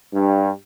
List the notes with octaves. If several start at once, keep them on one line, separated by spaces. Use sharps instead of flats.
G2